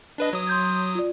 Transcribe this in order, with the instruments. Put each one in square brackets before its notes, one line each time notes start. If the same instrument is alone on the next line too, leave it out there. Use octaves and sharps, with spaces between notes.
[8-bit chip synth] D4 B4 D#5
F#3 D#6
[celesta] C6 G6 G#6
F4 D5